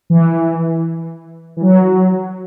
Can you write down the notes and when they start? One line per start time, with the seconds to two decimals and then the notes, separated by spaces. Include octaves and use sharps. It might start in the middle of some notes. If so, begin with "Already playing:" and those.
0.10 E3
1.57 E3
1.62 F#3